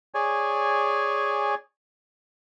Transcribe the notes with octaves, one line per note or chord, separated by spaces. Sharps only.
G#4 C#5 D5 G#5